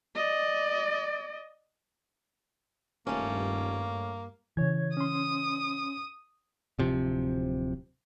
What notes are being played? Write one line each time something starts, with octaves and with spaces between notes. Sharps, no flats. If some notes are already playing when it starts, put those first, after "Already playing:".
D5 D#5
D#1 G2 A3 A#3 C#4
C#3 E3 C#5 G#6
C#4 C6 D#6
D1 C3 F3